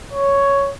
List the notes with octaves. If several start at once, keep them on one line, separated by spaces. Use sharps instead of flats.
C#5